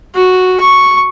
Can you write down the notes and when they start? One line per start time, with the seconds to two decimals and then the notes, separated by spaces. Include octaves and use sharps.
0.15 F#4
0.60 C#6